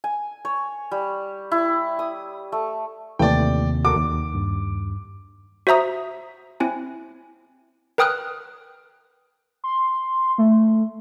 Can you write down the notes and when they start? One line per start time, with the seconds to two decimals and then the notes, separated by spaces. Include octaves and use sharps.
0.04 G#5
0.45 C#5
0.91 G3
1.52 E4
1.99 D#6
2.52 A3
3.19 D#2 C3 E3 A3 D5 G5
3.85 F#4 A4 A#4 D6
3.96 D#2
4.34 G2
5.67 F#4 C5 E5 A#5 D#6
6.60 C4 E4 G#5
7.98 A#4 B4 G5 D#6 F6 F#6
9.64 C6
10.38 A3